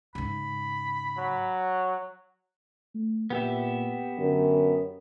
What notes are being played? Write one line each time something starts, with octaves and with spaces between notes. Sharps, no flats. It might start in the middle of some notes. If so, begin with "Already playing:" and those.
G#2 C#3 B5
F#3
A3
A#2 B3 G4 E5
F#2 D3